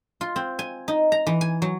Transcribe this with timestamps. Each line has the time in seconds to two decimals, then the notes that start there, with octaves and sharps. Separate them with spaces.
0.21 F4
0.36 C4
0.59 G#5
0.88 D#4
1.12 A#5
1.27 E3
1.41 G#5
1.62 F#3